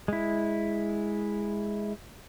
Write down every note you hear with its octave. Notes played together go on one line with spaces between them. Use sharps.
G#3 E4